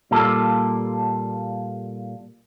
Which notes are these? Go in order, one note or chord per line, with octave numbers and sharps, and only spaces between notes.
A#2 G3 A#3 F4 A4